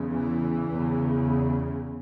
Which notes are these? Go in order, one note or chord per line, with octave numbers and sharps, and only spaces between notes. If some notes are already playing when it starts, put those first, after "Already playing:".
Already playing: E2 C#3
E3
E2 C#3